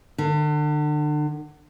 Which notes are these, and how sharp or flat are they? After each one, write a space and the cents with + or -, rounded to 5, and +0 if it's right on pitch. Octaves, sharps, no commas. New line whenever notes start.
D3 +35